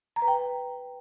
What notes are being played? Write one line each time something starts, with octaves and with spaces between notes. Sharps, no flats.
A#5
B4
G5